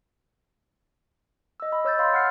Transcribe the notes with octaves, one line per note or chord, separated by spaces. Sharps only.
D#5 E6
D#5 B5
C#5 E6 G6 A6
F5 B5 C6
F#5 F6 C7